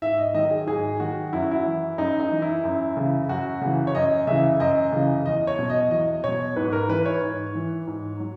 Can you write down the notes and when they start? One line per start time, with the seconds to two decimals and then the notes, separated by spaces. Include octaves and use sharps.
0.02 G#2 E5
0.18 D#5
0.34 D#3 F#3 D#5
0.51 G#4
0.67 G#2 G#4
1.00 D#3 F#3 F#4
1.33 F#2 E4
1.42 F#4
1.51 E4
1.66 E3
1.98 F#2 D#4
2.20 D#4
2.31 E3
2.42 E4
2.64 F#2
2.97 C#3 E3
3.29 F#2 F#4
3.62 C#3 E3
3.87 C#5
3.95 F#2 D#5
4.27 C#3 E3 E5
4.60 F#2 D#5
4.93 C#3 E3
5.26 E2 D#5
5.47 C#5
5.58 B2 F#3
5.70 D#5
5.91 E2 D#5
6.24 B2 F#3 C#5
6.56 G#2 B4
6.73 A#4
6.89 E3 B4
7.06 C#5
7.22 G#2
7.55 E3
7.87 G#2
8.20 F#3